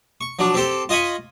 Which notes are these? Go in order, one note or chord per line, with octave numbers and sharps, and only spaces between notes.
C#6
F3 F#3 D4
C4 G4 A4 C5
F4 D#5 G#5 B5 C#6